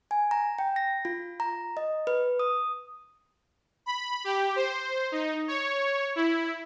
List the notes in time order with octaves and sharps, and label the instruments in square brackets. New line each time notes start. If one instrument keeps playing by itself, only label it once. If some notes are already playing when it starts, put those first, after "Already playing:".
[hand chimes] G#5
A#5
G5
A#6
F4
A#5
D#5
B4
D#6
[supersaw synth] B5
G4
C5
D#4
C#5
E4